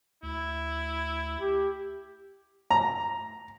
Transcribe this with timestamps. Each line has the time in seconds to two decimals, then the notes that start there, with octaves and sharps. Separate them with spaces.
0.23 D2 E4
1.40 G4
2.71 A#5